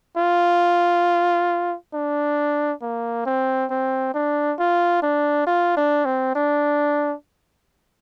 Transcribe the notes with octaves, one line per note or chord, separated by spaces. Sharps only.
F4
D4
A#3
C4
C4
D4
F4
D4
F4
D4
C4
D4